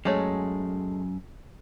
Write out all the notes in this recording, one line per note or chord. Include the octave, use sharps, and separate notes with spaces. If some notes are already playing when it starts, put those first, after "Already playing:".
F#2 G#3 A3 C#5